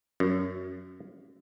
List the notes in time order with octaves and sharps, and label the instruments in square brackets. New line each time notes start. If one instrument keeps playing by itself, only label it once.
[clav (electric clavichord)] F#2